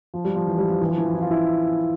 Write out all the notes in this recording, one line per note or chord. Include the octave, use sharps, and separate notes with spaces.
F3
G3
F3
E3
G3
F3
E3
F3
E3
F3
E4
F4
E4